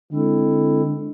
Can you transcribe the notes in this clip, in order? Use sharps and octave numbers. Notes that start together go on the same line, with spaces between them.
D3 G#3 C4 E4 A4